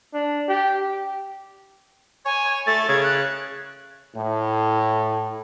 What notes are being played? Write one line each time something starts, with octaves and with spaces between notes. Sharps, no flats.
D4
G4
C#5 G#5
A3 A6
C#3 G#6
F#6
A2